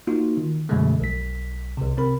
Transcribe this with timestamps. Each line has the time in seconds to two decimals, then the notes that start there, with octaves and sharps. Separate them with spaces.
0.07 A#3 D#4 F4 F#4
0.37 D#3
0.69 F#2 B2 D3 F3 G#3 A3
1.00 B1 B6
1.77 C2 C3
1.97 C3 C4 A#4 B5